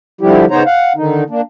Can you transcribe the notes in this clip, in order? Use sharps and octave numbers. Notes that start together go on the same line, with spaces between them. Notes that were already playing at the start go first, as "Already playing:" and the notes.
D3 F3 G3 E4 G4
C#3 B3 D#4 C5 C#5 A#5
F5 F#5
D3 D#3 D#4
A#3 D4